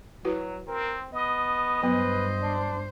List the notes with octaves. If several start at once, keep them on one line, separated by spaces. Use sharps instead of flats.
F#3 E4 F#4 B4
C4 A#4
B3 D#5
G2 F#3 B3 B4 C5
D4